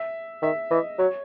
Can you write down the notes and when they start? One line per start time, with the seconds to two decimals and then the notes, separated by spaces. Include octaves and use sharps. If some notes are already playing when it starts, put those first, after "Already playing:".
Already playing: E5
0.42 D#3 E5
0.71 E3 D#5
0.99 F#3 C#5